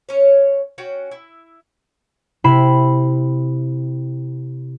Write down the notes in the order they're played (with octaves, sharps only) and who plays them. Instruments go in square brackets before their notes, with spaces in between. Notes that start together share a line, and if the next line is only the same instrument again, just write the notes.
[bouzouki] C#4 C#5
C#4 F#4 G5
E4
[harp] C3 E4 B5 C7 E7